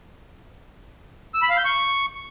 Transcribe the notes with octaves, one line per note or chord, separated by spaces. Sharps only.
E6
B5
F5
G6
C#6